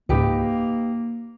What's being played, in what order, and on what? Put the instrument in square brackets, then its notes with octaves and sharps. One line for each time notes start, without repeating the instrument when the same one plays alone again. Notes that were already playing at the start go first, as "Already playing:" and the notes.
[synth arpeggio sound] C#2 G#2 [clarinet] A#3 [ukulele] D#4 G4 B4